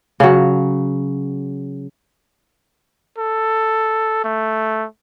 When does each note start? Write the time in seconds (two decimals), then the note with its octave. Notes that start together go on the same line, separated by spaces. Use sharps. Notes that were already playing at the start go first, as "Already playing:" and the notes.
0.20 C#3 F#3
3.18 A4
4.24 A3